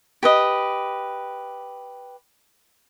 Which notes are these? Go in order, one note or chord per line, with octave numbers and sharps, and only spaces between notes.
G4 B4 D#5